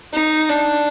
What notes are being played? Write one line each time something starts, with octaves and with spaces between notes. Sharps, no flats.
D#4
D4